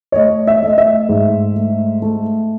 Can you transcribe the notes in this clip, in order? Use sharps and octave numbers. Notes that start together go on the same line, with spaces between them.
C#5
A3 D#5
E5
A3
D#5
E5
G#2
A3
A3